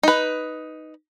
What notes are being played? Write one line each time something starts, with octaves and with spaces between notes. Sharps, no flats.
D#4 B4